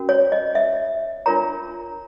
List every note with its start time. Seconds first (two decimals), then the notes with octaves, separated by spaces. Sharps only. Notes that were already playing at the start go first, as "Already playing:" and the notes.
Already playing: C#4 F#4 A#4
0.09 C#5
0.32 D#5
0.55 E5
1.26 D4 F4 A#4 C#5 A#5